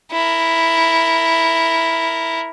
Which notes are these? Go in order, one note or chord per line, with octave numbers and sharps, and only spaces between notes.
E4 A#4